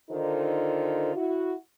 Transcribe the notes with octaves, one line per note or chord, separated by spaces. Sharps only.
D3 D#3 D#4 F4 A4 C5
E4 F#4